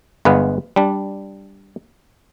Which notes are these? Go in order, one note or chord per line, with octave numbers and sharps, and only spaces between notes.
G1 G#3 B3 B4 F5
G3 D4